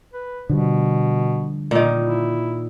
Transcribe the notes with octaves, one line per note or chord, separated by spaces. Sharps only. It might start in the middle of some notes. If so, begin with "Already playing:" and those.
B4
B2 D3 F3 G3
A#2 D#3
E4